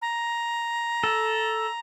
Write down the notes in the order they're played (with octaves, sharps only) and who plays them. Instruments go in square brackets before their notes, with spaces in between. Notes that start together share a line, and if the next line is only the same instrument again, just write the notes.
[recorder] A#5
[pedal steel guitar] A4